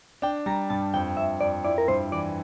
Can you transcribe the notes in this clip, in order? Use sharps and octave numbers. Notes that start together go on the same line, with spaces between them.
D4 G5
G3 A#5
G2 A5
F2 G5
F2 E5
F2 D5
E4 D5
A#4
G2 C5
E3 D5